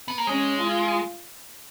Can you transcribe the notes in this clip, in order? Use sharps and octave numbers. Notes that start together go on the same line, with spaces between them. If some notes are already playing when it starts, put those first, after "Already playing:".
B3
A#3
G#3 C#4
F4